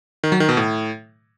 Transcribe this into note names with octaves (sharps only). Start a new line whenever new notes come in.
D#3
F#3
D#3
B2
A2